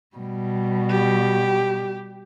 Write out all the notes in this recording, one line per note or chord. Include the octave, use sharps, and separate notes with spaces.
B2 G3
G4